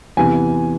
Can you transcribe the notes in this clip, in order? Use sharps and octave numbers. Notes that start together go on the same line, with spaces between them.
E2 C3 E3 G#5